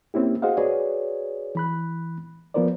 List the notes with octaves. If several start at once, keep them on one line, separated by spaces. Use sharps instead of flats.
A#3 C4 C#4 E4 G4
F#4 G#4 C5 D#5 F5 F#5
F#4 G#4 B4 C#5 D5
E3 B5 F#6
F3 B3 F4 A#4 C5 D5